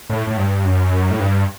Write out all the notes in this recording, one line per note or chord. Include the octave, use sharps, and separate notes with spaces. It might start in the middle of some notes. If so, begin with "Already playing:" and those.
A2
A2
G2
F#2
A2
G2